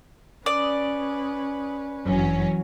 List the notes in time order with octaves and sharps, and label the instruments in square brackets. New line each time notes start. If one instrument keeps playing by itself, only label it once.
[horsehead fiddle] C#4 B4 [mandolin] D5 [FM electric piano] D#6
[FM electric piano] G1 F#2 [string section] E3 F#3 C#4